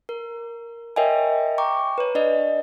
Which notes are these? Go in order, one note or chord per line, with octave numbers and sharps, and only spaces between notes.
A#4
A#4 C#5 D#5 E5 G5 G#5
G5 A#5 C#6 D6
B4 C#5
D4 D5 D#5